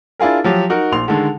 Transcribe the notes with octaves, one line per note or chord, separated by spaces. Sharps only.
D4 E4 F4 G#4 A#4
F3 F#3 G4
D#4 F#4 A#4
A#1 C6 F7
D3 D#3 G#3 A4